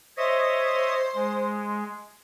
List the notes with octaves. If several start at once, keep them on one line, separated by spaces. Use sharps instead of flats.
C5 C#5 D#5 E5
G#3